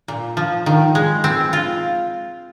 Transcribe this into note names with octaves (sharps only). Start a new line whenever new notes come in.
A#2
F3
D#3
G#3
C4
F4